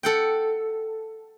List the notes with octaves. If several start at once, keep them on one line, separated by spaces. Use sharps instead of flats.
A4 F#5 G5